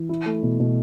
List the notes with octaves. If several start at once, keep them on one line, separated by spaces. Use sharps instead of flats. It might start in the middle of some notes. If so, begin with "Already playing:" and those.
Already playing: E3
E4
A3
B2
B2